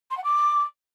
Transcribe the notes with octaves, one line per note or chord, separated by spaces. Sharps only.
C6
F#5
D6